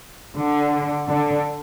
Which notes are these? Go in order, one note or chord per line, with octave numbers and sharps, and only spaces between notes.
D3
D3